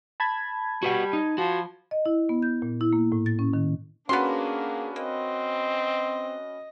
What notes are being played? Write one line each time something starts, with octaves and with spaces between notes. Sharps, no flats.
A5 B5 G#6
G3 F#4 B4 F#5
D#4
F3 F#4
D#5
E4
B3
G6
A#2
E4
A#3
A2
A6
C#4
D#3
A#3 B3 C#4 D4 F#4 G#4 B4 C6
A#3 C4 D#5